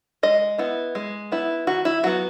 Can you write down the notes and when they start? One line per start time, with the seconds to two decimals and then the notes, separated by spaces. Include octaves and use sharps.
0.23 G#3 D#5
0.58 B3 E4
0.95 G#3
1.32 B3 E4
1.67 D#3 F#4
1.85 E4
2.03 F#3 B3 F#4